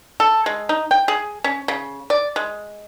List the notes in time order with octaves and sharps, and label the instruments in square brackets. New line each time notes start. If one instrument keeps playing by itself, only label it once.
[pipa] A4
G#3
D#4
G5
G#4
C#4
C#3
D5
G#3